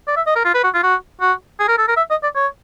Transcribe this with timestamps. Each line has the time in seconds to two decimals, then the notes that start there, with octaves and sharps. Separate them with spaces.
0.08 D5
0.16 E5
0.27 D#5
0.36 A#4
0.45 F4
0.54 B4
0.64 F#4
0.74 F4
0.83 F#4
1.21 F#4
1.59 G#4
1.68 A#4
1.78 A4
1.88 A#4
1.97 E5
2.10 D#5
2.23 D5
2.35 C#5